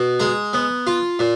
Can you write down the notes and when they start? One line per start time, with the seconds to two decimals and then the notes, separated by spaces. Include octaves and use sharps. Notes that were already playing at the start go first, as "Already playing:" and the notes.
Already playing: B2
0.20 G#3 A#5
0.53 B3
0.87 F4
1.19 A#2